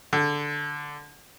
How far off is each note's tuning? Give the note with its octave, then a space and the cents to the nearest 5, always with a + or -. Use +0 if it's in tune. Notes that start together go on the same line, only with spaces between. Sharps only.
D3 +0 A4 +0